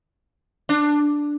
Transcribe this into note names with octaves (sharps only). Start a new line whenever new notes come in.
D4